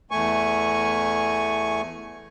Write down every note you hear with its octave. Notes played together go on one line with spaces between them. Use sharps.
E2 A3 G#5 C#6